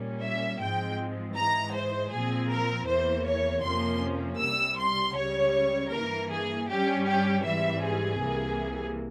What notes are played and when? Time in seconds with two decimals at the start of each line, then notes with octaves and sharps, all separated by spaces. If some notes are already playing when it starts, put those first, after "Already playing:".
Already playing: A#2 G3 A#3 C#4
0.22 E5
0.60 G#2 F3 G#3 C4 G5
1.36 G#2 E3 G#3 A#5
1.74 C5
2.12 A#2 F3 C4 G#4
2.50 A#4
2.88 E2 E3 A#3 C5
3.27 C#5
3.64 F2 C3 F3 A#3 C#4 C6
4.40 C2 C3 G3 E6
4.78 C6
5.16 C#2 C#3 G3 C#5
5.92 G2 E3 A#3 A#4
6.30 G#4
6.68 G2 G3 C#4 G4
7.06 G4
7.44 G#2 E3 G3 C4 E5
7.83 G#4
8.20 C2 C3 E3 A#3